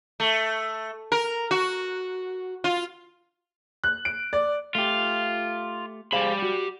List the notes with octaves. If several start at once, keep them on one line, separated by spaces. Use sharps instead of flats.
A3
A#4
F#4
F4
F#6
D7
D5
A3 F4 G4
G4 G#4 C5 F5 B5
F#4